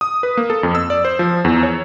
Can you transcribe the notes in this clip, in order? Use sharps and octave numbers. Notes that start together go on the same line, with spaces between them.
D#6
B4
A#3
A4
F2
E6
D5
C5
F3
E2
C#5